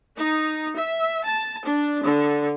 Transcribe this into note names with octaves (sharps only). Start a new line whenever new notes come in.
D#4
E5
A5
D4
D3